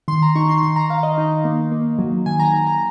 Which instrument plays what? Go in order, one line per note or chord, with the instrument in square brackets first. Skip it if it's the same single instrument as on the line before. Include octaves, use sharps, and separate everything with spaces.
[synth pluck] D#3 C6
A#5
D#4 C#6
C6
D#3 C6
A#5
D#3 F5
D#5
D#4
A#3
A#3
F#3
D#3 G#5
A#5
D#3
A#5